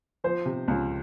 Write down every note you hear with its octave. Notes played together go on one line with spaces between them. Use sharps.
F3 C5
C3
C#2